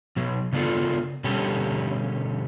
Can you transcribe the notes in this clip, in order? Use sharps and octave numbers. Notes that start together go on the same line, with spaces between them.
B2 F#3
C#3 B3 D4 F4 A4
B2 D3 G3 C#4 G4 A4